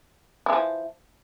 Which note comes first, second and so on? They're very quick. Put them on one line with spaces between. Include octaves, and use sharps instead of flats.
G#3 E3 F3